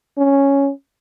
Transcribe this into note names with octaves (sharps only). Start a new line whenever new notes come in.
C#4